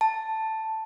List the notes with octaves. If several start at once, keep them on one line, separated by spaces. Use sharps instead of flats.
A5